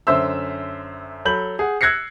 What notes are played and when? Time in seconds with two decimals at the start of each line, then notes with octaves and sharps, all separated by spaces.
0.07 F#2 D3 C5 E5 E6
1.25 F#3 A4 B5 G6 F#7
1.59 G#4 F#5
1.81 E6 F#6 G#6 A#6 C7 C#7